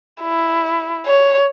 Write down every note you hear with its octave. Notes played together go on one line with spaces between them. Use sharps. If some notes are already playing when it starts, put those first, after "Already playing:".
E4
C#5